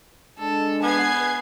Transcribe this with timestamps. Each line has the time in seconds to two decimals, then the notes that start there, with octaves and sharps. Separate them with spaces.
0.39 G#3 D4 A4
0.83 B3 B4 G#5 G#6 C7